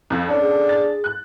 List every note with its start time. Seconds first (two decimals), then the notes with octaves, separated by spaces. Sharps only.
0.10 F2
0.29 C#4 D4 A4
0.41 G#4
0.69 A6
1.04 F#6